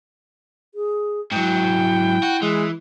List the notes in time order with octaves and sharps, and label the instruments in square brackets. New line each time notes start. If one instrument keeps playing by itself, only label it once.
[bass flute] G#4
[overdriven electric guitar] G#2 F#3 [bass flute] E4 [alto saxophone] G5
[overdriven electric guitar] F#4
[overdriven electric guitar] E3 [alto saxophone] G#3